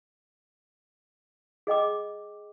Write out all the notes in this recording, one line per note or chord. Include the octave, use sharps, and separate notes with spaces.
G#4 D#5 G5 D6